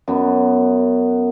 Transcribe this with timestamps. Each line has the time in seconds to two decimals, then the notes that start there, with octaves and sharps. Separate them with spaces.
0.08 F#2 B3